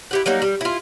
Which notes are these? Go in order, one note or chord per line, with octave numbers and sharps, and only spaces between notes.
E4 G4 F#5
F#3 G3 A#3 D#4
G3
E4 F4